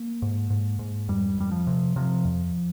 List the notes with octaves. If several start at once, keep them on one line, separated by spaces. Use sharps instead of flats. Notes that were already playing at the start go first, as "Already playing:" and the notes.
Already playing: A#3
G#2
G#2
G#2
F2 G3
F2 G3
F3
C3
C3 F3
F2